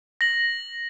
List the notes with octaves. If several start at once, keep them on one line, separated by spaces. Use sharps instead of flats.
A#6 F#7